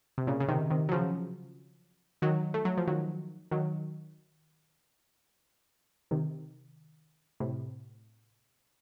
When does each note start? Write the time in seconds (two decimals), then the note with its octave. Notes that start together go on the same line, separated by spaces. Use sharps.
0.18 C3
0.27 A#2 C#3
0.40 C#3
0.48 C3 D#3
0.70 C3 D#3
0.89 F#3
0.92 C#3 F3
2.22 D#3 F#3
2.54 A3
2.65 F#3
2.77 F3
2.87 D#3 F#3
3.51 D#3 F#3
6.11 C3 D#3
7.40 A2 C3